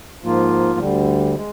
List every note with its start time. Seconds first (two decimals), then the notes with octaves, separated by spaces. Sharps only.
0.23 G#2 F3 A#3 F4
0.79 D2 D3 G3
1.36 G#3